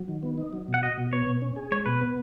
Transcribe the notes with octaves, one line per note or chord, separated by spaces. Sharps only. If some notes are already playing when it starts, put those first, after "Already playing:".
Already playing: F#3
D#3
B3
D#4
F#3
B2
F#5
F#4 D#5
B2
B3 C#5
B2
C#4
G#4
G#3 C#5
B2 B4
B3